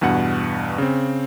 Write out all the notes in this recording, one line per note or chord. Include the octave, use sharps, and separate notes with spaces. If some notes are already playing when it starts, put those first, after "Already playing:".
E2 G2 B2 F#5
C#3 C4